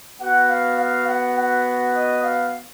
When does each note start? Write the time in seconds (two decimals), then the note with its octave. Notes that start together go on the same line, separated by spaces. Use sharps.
0.21 B3 F#4 F#5
0.50 F5
0.79 F5
1.08 F#5
1.38 F#5
1.95 D#5
2.24 F5